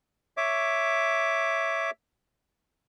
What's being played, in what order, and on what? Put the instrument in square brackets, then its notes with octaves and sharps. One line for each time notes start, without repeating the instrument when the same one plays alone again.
[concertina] C#5 E5 D6